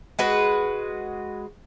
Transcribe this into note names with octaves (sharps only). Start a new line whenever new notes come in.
G#3 F#4 B4